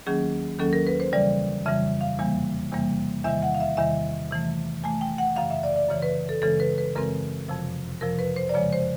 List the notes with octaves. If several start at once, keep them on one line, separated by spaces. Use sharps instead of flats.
D#2 D#3 F#3 A#3 C#4 G#4
D#2 D#3 F#3 A#3 C#4 A4
A#4
B4
C5
F2 C#3 E3 G3 D5
F2 C#3 E3 G3 E5
F5
E2 C3 E3 G3 A#3
E2 C3 E3 G3 A#3
E2 C3 D#3 G3 E5
F#5
F5
E5
E2 C3 D#3 G3 E5
C3 E3 A3
C3 E3 A3 G#5
G5
F#5
F#2 C#3 E3 F5
E5
D5
D5
F#2 C#3 E3 C#5
B4
A4
F#2 C#3 E3 G#3 C4 A4
B4
B4
F#2 C#3 E3 G#3 C4 A#4
F2 C3 F3
F2 C3 F3 A#4
B4
C5
D5
F#2 C#3 F3 G#3 C#5
C5